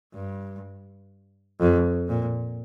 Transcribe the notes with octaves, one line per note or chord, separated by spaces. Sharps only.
G2
F2
A#2